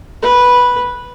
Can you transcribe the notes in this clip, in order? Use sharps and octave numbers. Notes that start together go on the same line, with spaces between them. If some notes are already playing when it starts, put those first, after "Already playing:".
B4